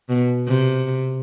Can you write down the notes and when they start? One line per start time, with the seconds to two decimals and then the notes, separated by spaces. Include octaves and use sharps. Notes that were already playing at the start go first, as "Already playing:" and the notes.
0.09 B2
0.47 C3